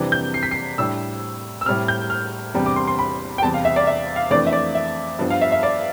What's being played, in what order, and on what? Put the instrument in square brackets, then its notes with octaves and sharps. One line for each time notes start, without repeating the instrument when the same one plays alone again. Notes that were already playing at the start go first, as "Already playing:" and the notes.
Already playing: [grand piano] F2 C3 E3 G3 D4
G6
C7
B6
C7
A2 G3 D4 E6
E6
A2 G3 C4 F6
G6
F6
E2 C3 G3 D4
D6
C6
C6
B5
G5
E2 C3 G3 A5
F5
E5
D5
E5
F5
F2 E3 A3 D4 D5
E5
D5
E5
G2 F3 B3
F5
E5
E5
D5